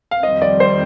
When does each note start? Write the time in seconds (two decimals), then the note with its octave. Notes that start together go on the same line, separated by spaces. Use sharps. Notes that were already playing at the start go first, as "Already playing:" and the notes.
0.11 F5
0.23 F2 D#3 G3 C4 D#5
0.42 D5
0.60 C5